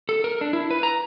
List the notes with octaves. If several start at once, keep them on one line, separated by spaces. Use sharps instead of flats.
A4
A#4
D4
E4
B4
A#5